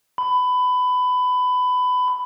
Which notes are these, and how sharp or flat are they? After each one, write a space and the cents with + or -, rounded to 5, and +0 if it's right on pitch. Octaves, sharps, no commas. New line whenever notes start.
B5 +20